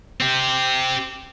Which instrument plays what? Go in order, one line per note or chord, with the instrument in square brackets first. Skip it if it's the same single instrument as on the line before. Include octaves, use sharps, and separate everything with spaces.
[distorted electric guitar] C4 G4